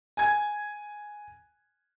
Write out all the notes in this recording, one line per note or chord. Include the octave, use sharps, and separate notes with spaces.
G#5 G#6